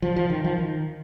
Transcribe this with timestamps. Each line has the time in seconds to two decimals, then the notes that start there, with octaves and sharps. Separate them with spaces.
0.02 F3
0.16 F3
0.30 D#3
0.44 F3
0.58 D#3